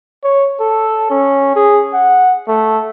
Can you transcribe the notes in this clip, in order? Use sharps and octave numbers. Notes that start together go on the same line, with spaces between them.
C#5
A4
C#4
G#4
F#5
A3